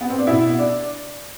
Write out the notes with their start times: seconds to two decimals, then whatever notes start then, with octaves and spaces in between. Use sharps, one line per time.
0.01 B3
0.09 C4
0.18 D4
0.27 B2 E4
0.59 D4